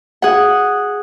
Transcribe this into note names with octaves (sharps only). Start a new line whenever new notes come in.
G#4 F#5